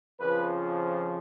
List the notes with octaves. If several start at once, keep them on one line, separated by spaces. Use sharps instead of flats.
F2 C#3 F3 B4